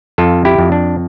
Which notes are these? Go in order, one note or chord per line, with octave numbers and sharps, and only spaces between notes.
F2 F4 A4
E4 G4
F2
D4